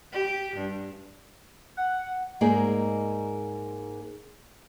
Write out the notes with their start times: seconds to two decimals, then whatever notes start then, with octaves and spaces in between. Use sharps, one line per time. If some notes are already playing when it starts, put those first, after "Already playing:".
0.12 G4
0.56 G2
1.77 F#5
2.41 G#2 A#3 D#4 G#4 D5